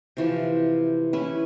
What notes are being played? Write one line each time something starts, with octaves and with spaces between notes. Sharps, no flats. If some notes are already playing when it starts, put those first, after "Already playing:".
C3 E3 F3
C#4 E4 B4